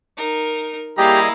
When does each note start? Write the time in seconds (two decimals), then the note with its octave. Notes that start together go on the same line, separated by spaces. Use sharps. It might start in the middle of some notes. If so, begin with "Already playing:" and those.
0.17 D#4 A#4
0.98 G3 A#3 E4 G4 G#4 D#5 F5 A#5